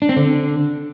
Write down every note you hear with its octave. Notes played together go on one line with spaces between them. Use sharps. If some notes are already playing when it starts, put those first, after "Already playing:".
D4
C4
D3